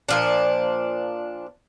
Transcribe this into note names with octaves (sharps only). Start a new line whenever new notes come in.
A#2 F3 D4